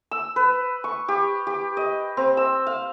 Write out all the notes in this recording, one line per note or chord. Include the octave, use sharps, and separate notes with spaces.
E6
B4
C#6
G4
G4
D#5
C4
E6
F5